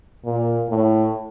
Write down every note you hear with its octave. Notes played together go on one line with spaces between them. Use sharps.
A#2
A2